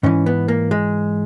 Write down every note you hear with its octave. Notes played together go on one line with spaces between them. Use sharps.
G#2 E3 C#4
B3
A#3
G#3